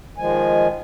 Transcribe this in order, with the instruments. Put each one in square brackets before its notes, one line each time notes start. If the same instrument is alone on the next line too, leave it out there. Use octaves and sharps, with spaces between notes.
[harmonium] D#3 F3 G#3 G#5